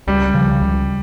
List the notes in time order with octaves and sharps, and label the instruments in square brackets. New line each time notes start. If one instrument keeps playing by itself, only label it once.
[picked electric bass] C#2 [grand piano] G3
[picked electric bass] C#3 F3
C#2